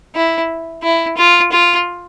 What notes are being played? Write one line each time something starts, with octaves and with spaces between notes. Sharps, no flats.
E4
E4
F4
F4